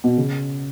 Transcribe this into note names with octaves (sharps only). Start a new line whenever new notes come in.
B2
C#3